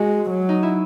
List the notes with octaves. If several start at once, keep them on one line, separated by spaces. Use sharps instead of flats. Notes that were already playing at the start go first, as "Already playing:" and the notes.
Already playing: G#3 F#4
F#3
D#4
E4